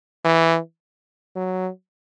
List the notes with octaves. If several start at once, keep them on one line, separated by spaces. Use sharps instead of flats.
E3
F#3